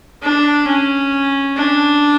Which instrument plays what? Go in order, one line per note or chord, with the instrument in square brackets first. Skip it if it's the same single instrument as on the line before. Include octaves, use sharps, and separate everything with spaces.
[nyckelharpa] D4
C#4
D4